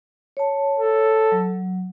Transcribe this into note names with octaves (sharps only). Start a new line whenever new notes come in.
C#5 A5
A4
F#3